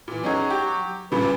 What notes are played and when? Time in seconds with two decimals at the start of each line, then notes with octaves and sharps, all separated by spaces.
0.08 A#2 E3
0.24 F#3 C#4 D#4 G#4
0.50 G4
1.12 G2 A#2 C#3 B4